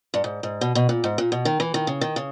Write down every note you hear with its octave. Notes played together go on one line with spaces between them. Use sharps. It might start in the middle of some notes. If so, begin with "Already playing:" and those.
G2
G#2
G#2
B2
B2
A#2
G#2
A#2
B2
D#3
E3
D#3
C#3
D#3
C#3